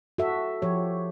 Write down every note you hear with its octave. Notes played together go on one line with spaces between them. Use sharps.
F#4 A4 E5
F3 G4 C#5